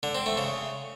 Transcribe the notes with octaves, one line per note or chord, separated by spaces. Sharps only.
D3
C4
A3
C#3